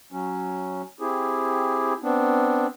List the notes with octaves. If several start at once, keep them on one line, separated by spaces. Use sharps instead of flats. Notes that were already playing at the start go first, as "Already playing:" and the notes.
F#3 C#4
C4 E4 G4 G#4
B3 C4 D4